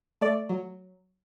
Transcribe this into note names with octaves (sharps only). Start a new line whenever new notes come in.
A3 D5
F#3